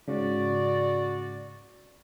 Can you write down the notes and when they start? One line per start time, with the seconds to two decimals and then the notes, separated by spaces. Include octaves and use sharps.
0.08 G#2 C#3 F#4 D5